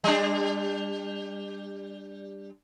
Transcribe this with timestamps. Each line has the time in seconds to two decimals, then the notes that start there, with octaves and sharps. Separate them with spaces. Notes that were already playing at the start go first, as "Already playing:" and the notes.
0.04 G3 D4